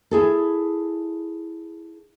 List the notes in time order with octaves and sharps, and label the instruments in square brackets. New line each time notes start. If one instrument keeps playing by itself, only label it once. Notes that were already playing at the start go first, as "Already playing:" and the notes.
[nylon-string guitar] E4 G#4 A4